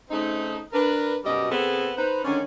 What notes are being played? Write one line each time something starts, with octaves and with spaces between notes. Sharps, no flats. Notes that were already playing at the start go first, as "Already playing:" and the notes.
C#3 A3 C4 D#4
D4 A#4 B4
F#2 B2 G3 G4 A4 D#5
C3 B3 C4 G#4 A4
D#4 B4 C5
D3 D#3 G#3 C#4